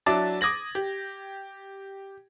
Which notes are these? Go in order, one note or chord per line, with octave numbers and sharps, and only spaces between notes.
F#3 D4 E4 A5 D6 A6
D6 D#6 G#6 A#6 F#7
G4